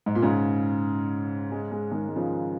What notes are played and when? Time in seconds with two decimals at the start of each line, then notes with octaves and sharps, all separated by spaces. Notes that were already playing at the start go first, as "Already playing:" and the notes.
0.06 G#2
0.15 A#2
0.22 G#2 C#3
1.52 G#3
1.72 G#3
1.91 D#3 G#3
2.08 G#3
2.16 C#3 F3